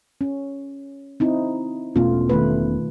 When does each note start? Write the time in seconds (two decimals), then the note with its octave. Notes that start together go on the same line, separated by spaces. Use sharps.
0.21 C#4
1.20 C4 D#4 E4
1.96 E1 B2 A3 B3 C#4 F4
2.29 D#3 A3 B4